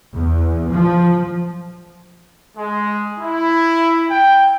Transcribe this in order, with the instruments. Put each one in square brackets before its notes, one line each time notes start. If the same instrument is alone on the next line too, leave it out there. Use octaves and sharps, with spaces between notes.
[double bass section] E2
F3
[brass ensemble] G#3
E4
G5